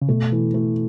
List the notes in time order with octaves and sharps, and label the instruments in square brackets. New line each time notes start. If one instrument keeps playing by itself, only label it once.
[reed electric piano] C#3
[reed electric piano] B2 [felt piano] A3
[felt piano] E3
A3